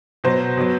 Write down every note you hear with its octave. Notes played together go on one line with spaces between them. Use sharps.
B2 F#3 C5
B2 F#3